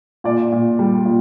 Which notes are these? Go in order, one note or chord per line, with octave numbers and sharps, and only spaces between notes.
A#2 D5
A#2
G3
A#2